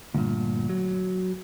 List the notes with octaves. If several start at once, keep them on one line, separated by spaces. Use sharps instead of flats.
D2 G2 A#2
F#3